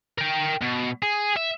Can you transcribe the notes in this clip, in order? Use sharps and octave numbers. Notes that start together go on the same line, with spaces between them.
A#4 G5
B2
G#4
E5